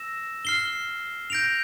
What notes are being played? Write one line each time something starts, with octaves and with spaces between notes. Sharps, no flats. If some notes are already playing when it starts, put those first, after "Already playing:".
Already playing: E6 A#6 E7
F6 C7 G7
G6 A#6 D7 F7